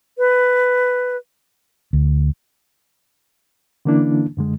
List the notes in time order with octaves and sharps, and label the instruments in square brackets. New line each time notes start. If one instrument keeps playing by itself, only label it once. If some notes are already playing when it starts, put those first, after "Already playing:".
[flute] B4
[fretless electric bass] D2
[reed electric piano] D3 E3 A#3 C#4 D4 E4
F#2 D3 G#3